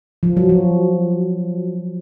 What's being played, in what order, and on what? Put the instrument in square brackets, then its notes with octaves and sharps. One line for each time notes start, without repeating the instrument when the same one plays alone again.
[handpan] F3
F#3
F3